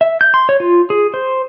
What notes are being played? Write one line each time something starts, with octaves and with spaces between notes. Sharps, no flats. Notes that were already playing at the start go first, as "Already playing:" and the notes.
E5
G6
C6
C#5
F4
G#4
C5